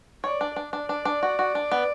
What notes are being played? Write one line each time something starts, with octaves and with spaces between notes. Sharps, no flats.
C#5 D5
D4
D4
D4
D4 D5
D4
F#4
F#4
D4
B3